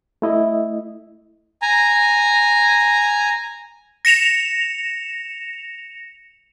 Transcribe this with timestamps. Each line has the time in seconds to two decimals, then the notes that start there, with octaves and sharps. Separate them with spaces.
0.22 A3 E4 D#5 E5
1.62 G#5 A#5
4.05 A#6 C#7 E7 F7